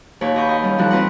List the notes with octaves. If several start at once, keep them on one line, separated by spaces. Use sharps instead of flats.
D#2 A#2 G4 B4 C#5
G4 D#5 F#5 B5 C#6 G6
D#5 F5
G3 C#4
E3 F3 G3 D#4 A4 F#6
C4 F4 B4 D#5 F#5